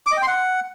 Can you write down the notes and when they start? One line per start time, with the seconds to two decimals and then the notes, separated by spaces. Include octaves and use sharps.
0.06 D6
0.12 D#5
0.17 G5
0.22 C6
0.28 F#5